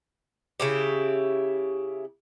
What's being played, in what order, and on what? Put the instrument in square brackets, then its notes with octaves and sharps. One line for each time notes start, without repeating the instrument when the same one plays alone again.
[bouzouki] C#3 E4 G4